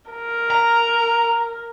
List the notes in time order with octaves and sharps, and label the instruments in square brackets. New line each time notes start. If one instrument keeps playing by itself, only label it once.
[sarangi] A#4
[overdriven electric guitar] A#5